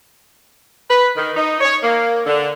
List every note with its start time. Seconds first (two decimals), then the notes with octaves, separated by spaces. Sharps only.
0.89 B4
1.16 D#3
1.37 D#4
1.61 C#5
1.83 A#3
2.26 D3